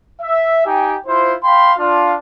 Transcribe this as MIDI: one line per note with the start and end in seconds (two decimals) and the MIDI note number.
0.21 0.65 76
0.65 0.95 63
0.65 0.95 67
0.65 0.95 79
0.65 0.95 80
1.07 1.34 64
1.07 1.34 65
1.07 1.34 72
1.44 1.73 77
1.44 1.73 79
1.44 1.73 83
1.44 1.73 84
1.78 2.15 62
1.78 2.15 65